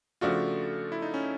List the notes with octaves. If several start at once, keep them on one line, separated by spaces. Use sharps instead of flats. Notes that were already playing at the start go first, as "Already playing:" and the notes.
C#3 F3 A3 D4 F4 F#4
E4
D#4
C#4